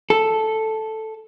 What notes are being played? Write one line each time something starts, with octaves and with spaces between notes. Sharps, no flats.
A4